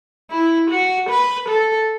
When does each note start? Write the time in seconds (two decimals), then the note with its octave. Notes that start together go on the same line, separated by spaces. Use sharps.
0.31 E4
0.70 F#4
1.09 B4
1.48 A4